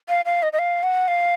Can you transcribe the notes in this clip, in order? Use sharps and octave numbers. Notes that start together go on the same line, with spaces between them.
F5
F5
D#5
D#5
F5
F#5
F5